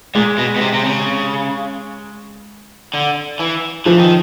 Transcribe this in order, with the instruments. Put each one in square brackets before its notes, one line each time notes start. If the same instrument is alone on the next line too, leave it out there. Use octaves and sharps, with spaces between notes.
[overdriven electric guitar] A#2 [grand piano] G#3
[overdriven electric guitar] B2
B2
C3
C3
C#3
D3
E3
[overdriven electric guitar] E3 [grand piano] F3
[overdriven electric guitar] D#3